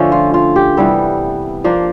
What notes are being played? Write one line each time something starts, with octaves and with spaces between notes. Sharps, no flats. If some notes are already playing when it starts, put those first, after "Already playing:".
Already playing: D3 F3 A3 C#4
F4
F4
G4
C3 E3 G3 B3 A4
F3 A#3 D4